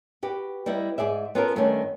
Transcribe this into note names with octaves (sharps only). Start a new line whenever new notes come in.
F#4 G4 B4
G3 B3 D#4 E4
G#2 G#4 D5 E5
B3 C#4 F4 F#4 A4 A#4
G2 D#3 A3 B3 C#4 D4